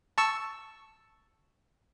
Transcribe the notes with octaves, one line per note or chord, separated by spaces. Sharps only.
A5 C#6 E6